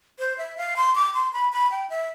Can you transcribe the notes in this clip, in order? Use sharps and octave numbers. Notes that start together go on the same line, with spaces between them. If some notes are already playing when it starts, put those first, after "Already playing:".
C5
E5
F5
C6
D6
C6
B5
B5
G5
E5